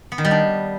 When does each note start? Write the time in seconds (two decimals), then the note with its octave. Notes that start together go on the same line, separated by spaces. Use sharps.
0.12 B3
0.18 D#3
0.25 G3
0.31 D4